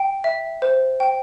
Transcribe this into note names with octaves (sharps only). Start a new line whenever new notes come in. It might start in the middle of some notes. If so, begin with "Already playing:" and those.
Already playing: G5
E5
C5
G5